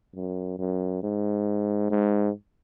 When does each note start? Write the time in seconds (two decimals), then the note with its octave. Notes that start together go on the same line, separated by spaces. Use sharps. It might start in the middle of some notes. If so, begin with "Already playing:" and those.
0.15 F#2
0.59 F#2
1.03 G#2
1.90 G#2